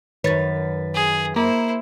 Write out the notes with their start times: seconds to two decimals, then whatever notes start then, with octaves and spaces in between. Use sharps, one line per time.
0.24 F#2 D#3 B4 C#5 A6
0.95 G#4
1.36 A#3 E4 C5